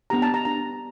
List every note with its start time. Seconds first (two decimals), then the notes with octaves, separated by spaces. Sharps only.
0.10 B3 D4 G4 A#5
0.22 A5
0.34 A#5
0.45 B3 D4 G4 A#5